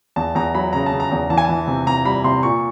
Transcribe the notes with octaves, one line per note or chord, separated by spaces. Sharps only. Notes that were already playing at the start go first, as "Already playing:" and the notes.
E2 A5
E2 A#5
F#3 B5
C#3 A#5
A5
C#3
A#5
E2
E3 A5
G#5
E3 A5
C3
C3 A#5
G3 B5
C3 C6
A#2 C#6